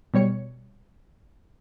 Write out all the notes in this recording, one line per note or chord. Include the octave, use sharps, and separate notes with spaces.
B2 G3 C#5 C#7